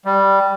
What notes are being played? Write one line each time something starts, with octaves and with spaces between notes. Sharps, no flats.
G3